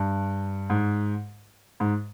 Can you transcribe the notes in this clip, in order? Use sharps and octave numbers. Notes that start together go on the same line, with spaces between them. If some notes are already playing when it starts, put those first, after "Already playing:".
Already playing: G2
G#2
G#2